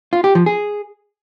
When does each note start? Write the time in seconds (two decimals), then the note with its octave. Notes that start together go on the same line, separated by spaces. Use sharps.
0.13 F4
0.24 G4
0.35 F3
0.46 G#4